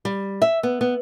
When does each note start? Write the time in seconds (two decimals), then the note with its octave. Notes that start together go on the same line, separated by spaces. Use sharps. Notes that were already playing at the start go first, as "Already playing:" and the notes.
0.05 G3
0.42 E5
0.63 B3
0.81 B3